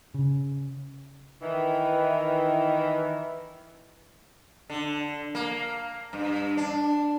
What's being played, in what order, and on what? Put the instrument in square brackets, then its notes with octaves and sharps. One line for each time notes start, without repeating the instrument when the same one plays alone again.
[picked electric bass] C#3
[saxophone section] D#3 E3
[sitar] D3
A#3
G2
D4